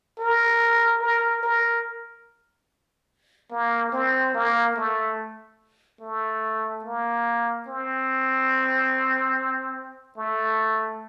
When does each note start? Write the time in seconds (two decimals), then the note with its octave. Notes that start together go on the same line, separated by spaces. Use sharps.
0.19 A#4
1.02 A#4
1.43 A#4
3.51 A#3
3.92 C4
4.34 A#3
4.76 A3
6.01 A3
6.85 A#3
7.68 C4
10.18 A3